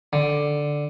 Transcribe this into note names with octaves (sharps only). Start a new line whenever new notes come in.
D3